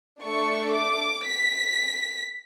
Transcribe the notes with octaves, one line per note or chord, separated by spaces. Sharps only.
A3 D4 A4 C#6
D6
B6